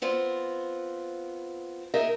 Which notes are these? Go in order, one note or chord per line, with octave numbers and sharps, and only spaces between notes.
B3 C4 F4
D#4 G#4 A#4 D#5 E5